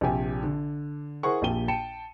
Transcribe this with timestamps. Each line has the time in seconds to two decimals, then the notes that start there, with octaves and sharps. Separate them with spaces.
0.01 A#1 C3 G4 G#5
0.43 D3
1.23 E4 G#4 A#4 C5 F#5 C#6
1.42 A#1 A#2 A#3 G4 D#7 G7
1.68 G5 A5 C#7 E7